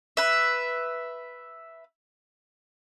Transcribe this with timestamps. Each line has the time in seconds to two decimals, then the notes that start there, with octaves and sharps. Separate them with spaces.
0.17 B4 E5